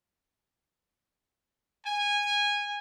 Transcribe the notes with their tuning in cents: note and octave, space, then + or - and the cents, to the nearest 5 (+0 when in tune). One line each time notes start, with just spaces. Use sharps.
G#5 -15